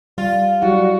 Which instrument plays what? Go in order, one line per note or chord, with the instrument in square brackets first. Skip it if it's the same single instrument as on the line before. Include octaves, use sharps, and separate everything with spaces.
[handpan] G3 [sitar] F4
[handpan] F#3 E4 F#5 [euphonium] G3 [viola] F#4